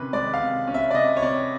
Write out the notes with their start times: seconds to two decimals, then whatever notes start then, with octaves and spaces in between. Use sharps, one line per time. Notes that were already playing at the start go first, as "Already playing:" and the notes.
Already playing: C3 D#3 C#4 B4
0.13 G#3 D5
0.34 F5
0.40 C3
0.67 C#4
0.74 E5
0.91 D5
0.94 C3 D#5
1.17 C#5
1.22 C3 D5